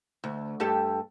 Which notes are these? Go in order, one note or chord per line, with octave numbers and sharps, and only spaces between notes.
D2
G2 G4 A4